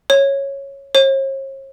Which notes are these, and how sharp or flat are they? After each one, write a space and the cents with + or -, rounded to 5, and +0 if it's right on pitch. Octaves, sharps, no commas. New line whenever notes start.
C#5 -5
C#5 -45